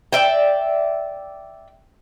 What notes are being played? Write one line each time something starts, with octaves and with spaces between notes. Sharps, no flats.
D5 E5 G5